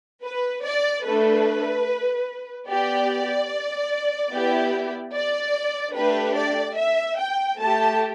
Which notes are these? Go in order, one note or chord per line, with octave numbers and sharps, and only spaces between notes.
B4
D5
A3 D4 A4 B4
B3 G4 D5
B3 E4 G4
D5
A3 D4 G4 B4
D5
E5
G5
A3 G4 A5